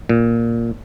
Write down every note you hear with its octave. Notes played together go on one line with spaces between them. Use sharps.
A#2